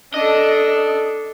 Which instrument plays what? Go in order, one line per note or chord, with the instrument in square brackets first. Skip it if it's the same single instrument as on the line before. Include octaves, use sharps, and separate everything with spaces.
[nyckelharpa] D4 A4 [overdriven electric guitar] D#5